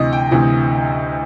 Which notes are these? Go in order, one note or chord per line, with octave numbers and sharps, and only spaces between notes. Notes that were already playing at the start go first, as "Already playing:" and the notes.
Already playing: D2 C3 E3 D#5
G5
D2 C3 E3